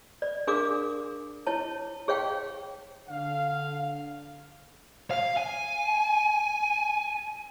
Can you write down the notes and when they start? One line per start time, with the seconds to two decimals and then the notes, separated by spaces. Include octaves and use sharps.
0.22 D5
0.47 D4 G#4 A#4 F5 D6
1.47 E4 C#5 A5
2.08 G#4 C#5 F5 G5
3.10 D3 F5
5.11 F5
5.37 G#5